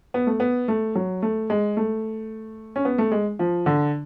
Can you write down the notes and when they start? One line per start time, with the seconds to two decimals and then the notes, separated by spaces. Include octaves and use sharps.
0.14 B3
0.27 A3
0.40 B3
0.68 A3
0.95 F#3
1.22 A3
1.50 G#3
1.77 A3
2.76 C#4
2.85 B3
2.98 A3
3.12 G#3
3.39 F3
3.66 D3